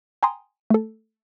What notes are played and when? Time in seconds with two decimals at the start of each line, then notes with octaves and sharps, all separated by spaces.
0.23 G5 G#5 A#5 C6 D#6
0.70 A3 A4